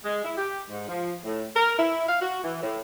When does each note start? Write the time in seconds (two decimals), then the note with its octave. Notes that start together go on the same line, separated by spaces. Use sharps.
0.05 G#3
0.25 E4
0.37 G4
0.70 G#2
0.89 F3
1.24 A2
1.56 A#4
1.79 E4
2.09 F5
2.21 F#4
2.44 E3
2.63 A2